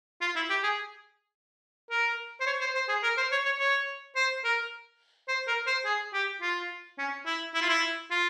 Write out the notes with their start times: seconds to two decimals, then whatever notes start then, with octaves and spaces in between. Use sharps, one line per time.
0.21 F4
0.36 E4
0.50 G4
0.63 G#4
1.91 A#4
2.40 C5
2.46 C#5
2.61 C5
2.75 C5
2.89 G#4
3.03 A#4
3.17 C5
3.32 C#5
3.45 C#5
3.60 C#5
4.16 C5
4.44 A#4
5.28 C5
5.48 A#4
5.67 C5
5.85 G#4
6.14 G4
6.42 F4
6.98 C#4
7.26 E4
7.54 E4
7.62 F4
7.69 E4
8.11 F4